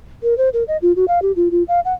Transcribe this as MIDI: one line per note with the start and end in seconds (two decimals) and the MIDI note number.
0.23 0.37 70
0.38 0.49 72
0.53 0.63 70
0.68 0.77 75
0.82 0.92 65
0.96 1.05 66
1.08 1.22 77
1.22 1.32 67
1.36 1.48 65
1.51 1.63 65
1.68 1.80 77
1.85 1.93 78